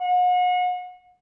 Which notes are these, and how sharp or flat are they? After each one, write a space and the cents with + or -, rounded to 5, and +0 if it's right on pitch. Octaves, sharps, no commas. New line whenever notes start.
F#5 -40